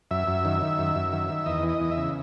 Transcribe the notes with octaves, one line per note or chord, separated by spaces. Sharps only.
F#2 E5
F#2
D#3
D#3
F#2
F#2
D#3
D#3
E2 D#5
E3
D#5
E2
E5
C#3